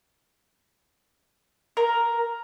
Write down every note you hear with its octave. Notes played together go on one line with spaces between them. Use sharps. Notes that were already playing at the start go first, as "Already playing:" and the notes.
A#4